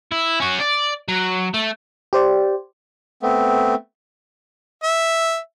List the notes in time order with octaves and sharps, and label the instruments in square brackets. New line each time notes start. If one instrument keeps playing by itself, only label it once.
[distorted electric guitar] E4
C#4 F#4
D5
F#3
A3
[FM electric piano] G4 C5 D5
[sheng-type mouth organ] A3 B3 C4
[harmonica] E5